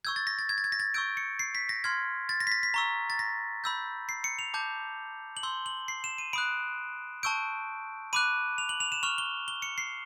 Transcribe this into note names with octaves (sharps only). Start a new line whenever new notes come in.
C#6 E6 G6 G#6
A6
A#6
A6
G#6
A6
G#6
A#6
A6
C#6 E6 G6 D7
C#7
C7
B6
A#6
C6 F6 G#6
A6
A#6
B6
A#6
B6
A#5 C#6 E6
A6
A#6
B5 E6 G6
C7
C#7
F7
A5 D6 G6
F#7
C6 E6 G6 G7
F#7
C7
E7
D#7
B5 D#6 F#6 D7
A5 C#6 E6 G6 D7
B5 D6 F#6 D#7
F7
F#7
F7
E7
C#6 F6 F7
G7
G7
C#7
C7